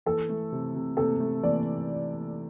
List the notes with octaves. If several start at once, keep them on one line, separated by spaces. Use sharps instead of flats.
E3 A4
A3
C3
C3
C3 A4
A3
E3 D5